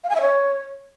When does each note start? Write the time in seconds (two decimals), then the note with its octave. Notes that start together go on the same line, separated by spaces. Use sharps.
0.04 F5
0.09 G#5
0.15 E5
0.21 C#5